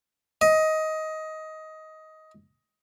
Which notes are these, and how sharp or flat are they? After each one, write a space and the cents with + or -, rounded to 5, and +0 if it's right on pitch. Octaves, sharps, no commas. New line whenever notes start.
D#5 +15